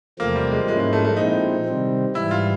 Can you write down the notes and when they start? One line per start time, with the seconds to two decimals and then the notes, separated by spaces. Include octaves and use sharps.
0.19 E2 C3 F3 A3 A#3 C4
0.36 G3
0.51 G#3
0.68 G#2 F3 G#3 A#3 C#4 E4
0.80 G#3
0.93 A3
1.04 A3
1.17 A#2 F3 G#3 C4 D#4 E4
1.66 C3 D#3 G3 C4
2.15 G#2 E3 G3 E4
2.31 F4